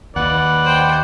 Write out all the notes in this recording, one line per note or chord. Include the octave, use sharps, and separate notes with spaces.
D#2 B4 D5 F#5
C5 G5